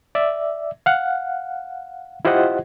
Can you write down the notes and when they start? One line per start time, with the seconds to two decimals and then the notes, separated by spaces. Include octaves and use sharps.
0.15 D5 E5
0.86 F5 F#5
2.25 E4 F4 G4 C5 D#5 F#5